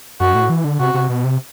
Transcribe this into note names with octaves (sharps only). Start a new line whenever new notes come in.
F#2 F#4
A2
E3
D3
C3 F#4
C3
B2
C3